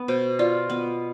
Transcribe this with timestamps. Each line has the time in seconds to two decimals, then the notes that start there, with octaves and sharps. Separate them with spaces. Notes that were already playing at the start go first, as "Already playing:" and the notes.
Already playing: B3
0.08 B2 C5
0.39 F4 D5
0.70 B3